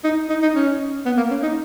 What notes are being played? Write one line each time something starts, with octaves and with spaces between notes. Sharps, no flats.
D#4
D#4
D#4
C#4
B3
A#3
C#4
D#4